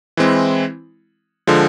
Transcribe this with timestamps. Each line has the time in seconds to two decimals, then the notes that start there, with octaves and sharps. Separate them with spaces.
0.17 E3 G#3 C4 E4
1.47 D3 F3 G#3